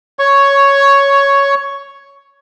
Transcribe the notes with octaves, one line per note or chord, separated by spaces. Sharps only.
C#5 C#6